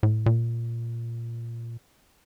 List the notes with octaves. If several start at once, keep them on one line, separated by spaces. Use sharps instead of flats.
A2
A#2